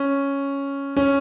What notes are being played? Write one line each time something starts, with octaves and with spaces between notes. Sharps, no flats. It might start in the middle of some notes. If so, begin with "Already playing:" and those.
Already playing: C#4
C#4